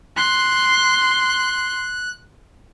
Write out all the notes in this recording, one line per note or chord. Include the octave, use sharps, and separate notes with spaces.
C6 F#6